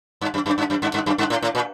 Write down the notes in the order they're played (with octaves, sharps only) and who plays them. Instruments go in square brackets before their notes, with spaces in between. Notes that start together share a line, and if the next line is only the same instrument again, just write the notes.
[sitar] G2
F#2
F#2
G2
F#2
G2
G2
F#2
G2
A2
A2
A#2